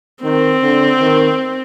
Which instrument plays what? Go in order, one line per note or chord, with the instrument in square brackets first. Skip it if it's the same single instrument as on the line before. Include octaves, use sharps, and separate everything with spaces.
[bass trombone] D#3 [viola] C4
[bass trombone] D3
D#3